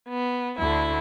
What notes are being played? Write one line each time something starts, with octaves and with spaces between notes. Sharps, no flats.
B3
D2 D3 E4